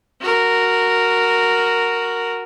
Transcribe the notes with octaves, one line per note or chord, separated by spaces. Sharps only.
F#4 A#4